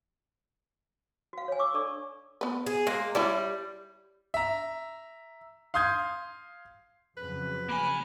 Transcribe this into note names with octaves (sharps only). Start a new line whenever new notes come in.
F#4 F5
C#5 G#5
C#6 D6 E6
D4 A4 D5 C#6
B3 B4
G#4
G#3 A#3
G3 E4 C#5 D5
E5 A#5
F5 C6 D#6 G6 G#6
F2 C#3 F#3 B4
A#3 G#5 B5